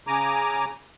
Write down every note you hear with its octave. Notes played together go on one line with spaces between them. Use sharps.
C#3 G#5 A#5 D6